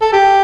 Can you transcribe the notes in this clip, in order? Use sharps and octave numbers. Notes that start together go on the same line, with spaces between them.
A4
G4